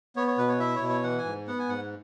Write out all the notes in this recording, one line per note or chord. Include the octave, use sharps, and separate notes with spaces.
B3 C#5
C#5
B2 B4
C#5
E4 E5
C#5
B2
C#5
E3 F#5
G#5
G#2
B3 F#5
G#5
G#2 F#5